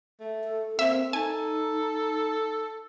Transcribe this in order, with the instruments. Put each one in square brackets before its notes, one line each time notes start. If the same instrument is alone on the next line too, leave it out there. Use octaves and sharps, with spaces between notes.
[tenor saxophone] A3
[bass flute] A4
[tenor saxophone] A#3 [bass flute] C4 [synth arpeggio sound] E5
[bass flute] D#4 [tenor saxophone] A4 [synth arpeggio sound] G#5